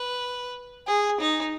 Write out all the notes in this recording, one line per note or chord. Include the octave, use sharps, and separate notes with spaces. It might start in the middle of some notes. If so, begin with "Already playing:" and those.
Already playing: B4
G#4
D#4